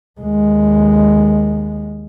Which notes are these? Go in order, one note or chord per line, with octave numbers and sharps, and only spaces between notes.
D#2 G#3